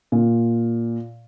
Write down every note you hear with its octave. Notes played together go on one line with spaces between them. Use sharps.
A#2